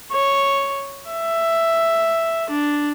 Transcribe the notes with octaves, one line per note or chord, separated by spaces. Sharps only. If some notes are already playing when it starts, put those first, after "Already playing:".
C#5
E5
D4